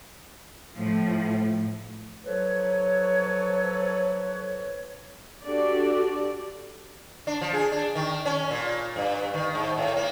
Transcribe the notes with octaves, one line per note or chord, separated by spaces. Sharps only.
A2 F3
F3 F#3 A4 B4 C#5
D4 F#4 G4 A4 D5
D4
F3
G#4
D4
D#3
C#4
A#2
G2
D#3
G#2
A2
A#3